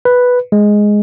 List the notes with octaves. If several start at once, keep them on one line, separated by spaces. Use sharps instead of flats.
B4
G#3